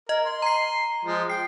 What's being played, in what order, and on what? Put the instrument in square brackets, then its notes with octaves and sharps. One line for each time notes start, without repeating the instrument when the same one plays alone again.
[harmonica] A#4 [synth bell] D#5
[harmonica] C6
[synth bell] A#5 C7
[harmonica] F3 G#3
[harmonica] G5 [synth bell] C7